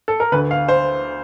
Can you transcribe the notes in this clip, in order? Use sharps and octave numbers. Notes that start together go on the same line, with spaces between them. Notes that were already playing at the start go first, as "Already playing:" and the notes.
A4
A#4
D2 D3 B4
F5
C5